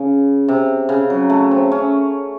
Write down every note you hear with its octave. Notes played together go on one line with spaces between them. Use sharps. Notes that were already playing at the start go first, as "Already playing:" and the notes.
Already playing: C#3
C3
C#3
F#3
A3
C4
C#4